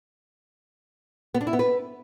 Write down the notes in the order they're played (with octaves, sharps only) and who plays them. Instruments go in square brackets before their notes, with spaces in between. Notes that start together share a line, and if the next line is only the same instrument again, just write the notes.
[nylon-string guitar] B3
D4
E4
B3
B4